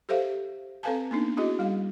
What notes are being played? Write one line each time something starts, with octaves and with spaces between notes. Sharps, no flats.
G4 A4 C5 E5 F5
C4 A4 B4 F5 G#5 A5
A#3 B3 D4 D#4
C#4 E4 F#4 G#4 D#5
G3 F5